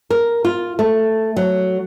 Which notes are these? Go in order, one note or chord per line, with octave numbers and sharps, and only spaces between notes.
A#4
F4
A3
F#3